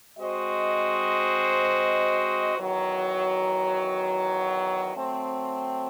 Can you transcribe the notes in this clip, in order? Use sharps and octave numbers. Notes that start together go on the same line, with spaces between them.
G#3 C4 F#4 C5 D#5
E2 D#3 F#3
F#3 A3 C4